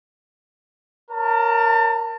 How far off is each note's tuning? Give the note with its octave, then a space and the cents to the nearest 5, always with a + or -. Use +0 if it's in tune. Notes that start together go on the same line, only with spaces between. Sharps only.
A#4 +0 C#5 +0 A5 +35